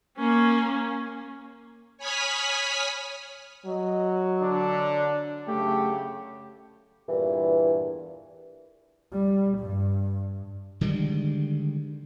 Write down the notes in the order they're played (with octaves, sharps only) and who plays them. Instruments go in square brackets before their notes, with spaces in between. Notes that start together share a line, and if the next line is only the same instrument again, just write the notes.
[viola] A#3 C#4
[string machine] C#5 G#5 B5 D#6 F6 B6
[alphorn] F#3 [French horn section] D#5
[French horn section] D3 [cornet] D4
[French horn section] F#2 C#3 [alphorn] A3 [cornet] G4
[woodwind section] E2 G2 A#2 E3
[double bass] G3
G2
[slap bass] D3 D#3 G3 G#3